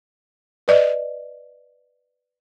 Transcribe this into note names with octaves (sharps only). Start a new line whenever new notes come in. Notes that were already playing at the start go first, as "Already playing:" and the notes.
B4 D5 D#5